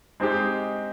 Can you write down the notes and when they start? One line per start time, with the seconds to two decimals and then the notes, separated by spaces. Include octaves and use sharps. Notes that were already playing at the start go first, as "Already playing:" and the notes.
0.20 G#3 C4 D#4 G4